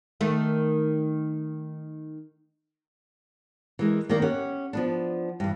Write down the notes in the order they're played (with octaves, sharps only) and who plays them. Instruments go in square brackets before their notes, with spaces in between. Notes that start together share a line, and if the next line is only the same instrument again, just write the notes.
[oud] D#3 A3
[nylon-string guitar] E3 G#3 A#4
D#3 G3 A#3 D5
C#4 G4 F#5
F3 B3 D4
G2 E3